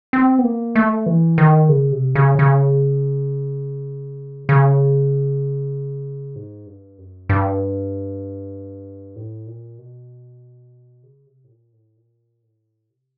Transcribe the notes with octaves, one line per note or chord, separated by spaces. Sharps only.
C4
B3
A#3
A3
E3
D#3
C#3
C3
C#3
C#3
C#3
G#2
G2
F#2
G2
A2
A#2
B2
C#3
C3
A2
A#2
A2
A#2
A2
C3